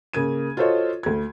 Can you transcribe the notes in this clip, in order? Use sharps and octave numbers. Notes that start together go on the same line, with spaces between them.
C#3 A#3 G#6 D#7
F4 F#4 A4 C5 C#5 D#5
D2 G#6